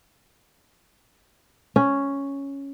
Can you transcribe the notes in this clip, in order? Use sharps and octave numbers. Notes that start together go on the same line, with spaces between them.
C#4